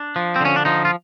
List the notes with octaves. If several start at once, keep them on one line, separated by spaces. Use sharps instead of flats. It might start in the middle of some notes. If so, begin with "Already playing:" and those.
Already playing: D4
F3
C4
D3 C#4
D4
F3 D#4
F4